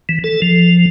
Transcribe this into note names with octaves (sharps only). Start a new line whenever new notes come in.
E3
A4
F3